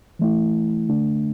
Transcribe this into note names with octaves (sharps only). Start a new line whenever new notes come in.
E3 A3 E4
D3 A3 D4